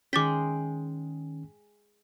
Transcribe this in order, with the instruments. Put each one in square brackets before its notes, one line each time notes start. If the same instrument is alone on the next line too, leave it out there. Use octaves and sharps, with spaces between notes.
[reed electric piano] D#3 C#4 [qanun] G#3 G5 [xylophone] D6 A6 B6